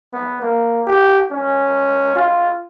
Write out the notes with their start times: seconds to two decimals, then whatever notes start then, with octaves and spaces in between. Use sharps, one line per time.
0.13 B3
0.42 A#3
0.87 G4
1.31 C#4
2.15 F4